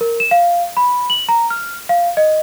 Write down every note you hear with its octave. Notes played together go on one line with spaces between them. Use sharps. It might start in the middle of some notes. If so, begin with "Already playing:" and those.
A#4
E7
F5
B5
F#7
A#5
F6
F5
D#5